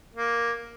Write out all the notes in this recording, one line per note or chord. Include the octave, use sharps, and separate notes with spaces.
A#3